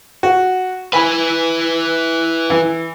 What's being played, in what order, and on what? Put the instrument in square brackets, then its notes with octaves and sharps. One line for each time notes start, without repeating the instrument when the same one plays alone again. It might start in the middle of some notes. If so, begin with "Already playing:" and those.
[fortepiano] F#4
[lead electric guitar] E4 B4 [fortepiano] G#5 B5
[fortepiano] E3